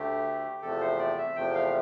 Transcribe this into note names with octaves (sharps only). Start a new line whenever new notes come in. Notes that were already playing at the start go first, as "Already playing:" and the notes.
Already playing: D2 D3 A3 G4
E2 C3 F3 A3 A4
C5
D5
E5
E2 C3 F3 A3 G5
F5